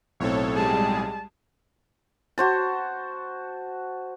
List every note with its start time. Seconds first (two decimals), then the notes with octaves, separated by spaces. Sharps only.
0.20 B1 A2 C4 A4 C#5
0.55 G3 G#3 G#4 A5
2.38 F#4 C5 A5